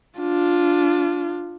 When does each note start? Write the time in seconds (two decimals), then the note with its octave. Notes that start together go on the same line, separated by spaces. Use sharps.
0.20 D4 F4